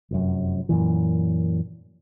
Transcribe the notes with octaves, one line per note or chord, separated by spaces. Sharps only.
F1 F#2
F#2 A#2 E3